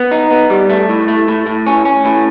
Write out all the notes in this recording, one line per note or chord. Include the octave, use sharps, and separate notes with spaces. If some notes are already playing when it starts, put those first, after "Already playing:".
Already playing: B3
D#4
B3
G3
A3
A2
A3
A2
A2
C#4
C#4
A2